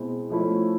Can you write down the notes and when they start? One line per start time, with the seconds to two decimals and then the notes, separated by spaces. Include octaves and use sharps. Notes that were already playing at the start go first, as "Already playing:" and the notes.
Already playing: B2 G#3 C4 E4
0.30 F3 A3 C#4 E4